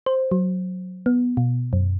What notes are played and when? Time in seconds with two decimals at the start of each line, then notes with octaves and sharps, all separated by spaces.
0.06 C5
0.31 F#3
1.06 B3
1.37 B2
1.73 F#2